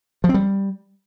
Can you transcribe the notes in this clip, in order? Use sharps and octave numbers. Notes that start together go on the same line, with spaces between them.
F3
C4
G3